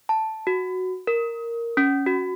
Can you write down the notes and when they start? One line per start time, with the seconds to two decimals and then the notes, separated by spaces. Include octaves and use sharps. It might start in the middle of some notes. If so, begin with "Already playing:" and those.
0.09 A5
0.47 F#4
1.07 A#4
1.77 C#4
2.06 F#4